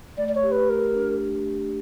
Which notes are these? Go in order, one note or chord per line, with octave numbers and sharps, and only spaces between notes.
A3 D5
D5
C#5
G4
B4
A3 A#4
D4